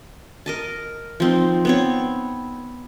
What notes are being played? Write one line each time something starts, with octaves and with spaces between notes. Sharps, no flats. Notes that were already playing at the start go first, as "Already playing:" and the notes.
A#4 D#5 A5
F3 C4 D#4
B3 C4 C#5